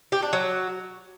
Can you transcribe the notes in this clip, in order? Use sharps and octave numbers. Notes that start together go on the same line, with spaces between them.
G4
D4
F#3